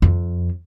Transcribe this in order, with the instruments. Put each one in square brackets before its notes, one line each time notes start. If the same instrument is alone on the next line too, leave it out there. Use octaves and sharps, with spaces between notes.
[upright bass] F2